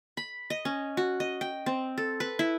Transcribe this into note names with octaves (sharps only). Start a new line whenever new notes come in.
B5
D#5
C#4
F#4
D#5
G5
C4
A4
B4
E4